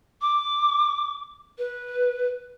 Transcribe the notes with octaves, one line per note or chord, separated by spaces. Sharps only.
D6
B4